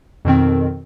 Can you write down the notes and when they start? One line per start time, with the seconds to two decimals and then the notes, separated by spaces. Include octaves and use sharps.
0.25 F2 B2 D#3 C4